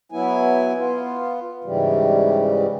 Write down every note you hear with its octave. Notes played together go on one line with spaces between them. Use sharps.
F#3 B3 E4 G#5
B3 F4
G#2 C#3 E3 G3